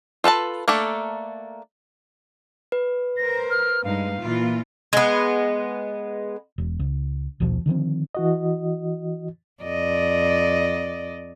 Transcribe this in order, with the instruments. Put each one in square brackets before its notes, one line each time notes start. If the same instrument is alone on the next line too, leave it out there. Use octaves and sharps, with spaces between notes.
[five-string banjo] F4 A4 B4 A5
A3 A#3 D4 A4
[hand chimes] B4
[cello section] A#4 C5 [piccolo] A#6
[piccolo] F6
[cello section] G2 G#3 D#4 [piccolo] F5
[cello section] A#2 E3 F4
[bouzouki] G#3 B3
[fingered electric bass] E1
C#2
A#1 D#2 B2 F3
D3 D#3 F3 C4
[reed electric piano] E3 F#4 D#5
[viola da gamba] F2 D5 D#5